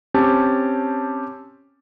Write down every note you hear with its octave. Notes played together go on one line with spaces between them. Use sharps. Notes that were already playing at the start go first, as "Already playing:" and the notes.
C4 C#4 G4 A5